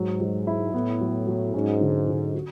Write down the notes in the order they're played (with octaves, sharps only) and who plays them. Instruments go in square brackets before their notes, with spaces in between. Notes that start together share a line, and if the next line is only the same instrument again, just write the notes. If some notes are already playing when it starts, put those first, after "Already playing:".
Already playing: [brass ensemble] G#2 [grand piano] F#3
[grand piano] F#3
E4
[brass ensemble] A2 [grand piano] B3
[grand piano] F#3
F#3
[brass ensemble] G#2 [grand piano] C#4
[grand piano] D3
D3
F#4